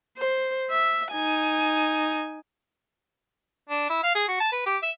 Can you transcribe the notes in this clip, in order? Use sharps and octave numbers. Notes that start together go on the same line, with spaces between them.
C5
E5
D#4 G#5
D4
E4
F5
G#4
F#4
A5
B4
G4
E5